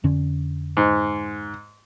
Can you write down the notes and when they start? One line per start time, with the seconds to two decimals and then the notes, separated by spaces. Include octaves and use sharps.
0.04 F2 D3 C#4
0.77 G#2